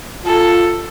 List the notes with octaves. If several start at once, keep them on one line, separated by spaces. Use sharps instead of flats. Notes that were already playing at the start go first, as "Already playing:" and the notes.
F4 A4